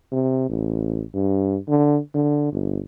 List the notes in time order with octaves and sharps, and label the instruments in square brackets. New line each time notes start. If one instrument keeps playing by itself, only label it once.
[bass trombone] C3
A1
G2
D3
D3
G1